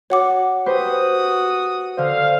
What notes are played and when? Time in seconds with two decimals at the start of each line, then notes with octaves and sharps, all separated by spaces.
0.10 F#4 C#5 F#5 D6
0.66 F#4 G4 B4 C5 D#6
1.97 D3 C5 F5